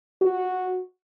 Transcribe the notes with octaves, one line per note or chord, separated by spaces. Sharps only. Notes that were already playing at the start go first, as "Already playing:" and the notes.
F#4